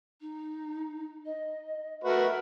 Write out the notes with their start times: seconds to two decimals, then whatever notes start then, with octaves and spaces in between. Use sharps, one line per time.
0.21 D#4
1.26 D#5
2.04 A3 F#4 A#4 B4 E5